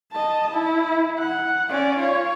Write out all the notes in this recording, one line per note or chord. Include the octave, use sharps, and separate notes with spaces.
D#5 A5
E4
F#5
C#4 D5
F4 C#5